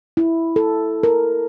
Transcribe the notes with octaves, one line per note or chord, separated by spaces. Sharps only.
E4
A4
A#4